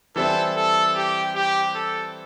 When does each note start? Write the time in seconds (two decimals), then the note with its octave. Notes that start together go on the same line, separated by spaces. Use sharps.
0.16 E3 G3 C4 E4 A4 C5
0.56 A4
0.95 G4
1.35 G4
1.75 A4